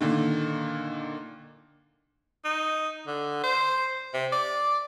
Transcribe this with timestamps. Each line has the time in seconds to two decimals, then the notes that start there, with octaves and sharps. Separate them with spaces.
0.01 A#2 D3 D#3
2.45 D#4
3.07 D3
3.44 C5
4.14 C3
4.32 D5